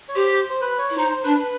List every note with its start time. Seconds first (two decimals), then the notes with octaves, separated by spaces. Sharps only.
0.09 C#5
0.15 G4 C5
0.50 C5
0.61 B4
0.78 C#5
0.90 E4
0.97 D#4 C5
1.10 C5
1.24 D4 B4
1.39 B4